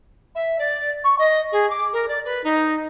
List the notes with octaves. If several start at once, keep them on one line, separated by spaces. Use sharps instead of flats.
E5
D5
C#6
D#5
G#4
D6
A#4
D5
B4
D#4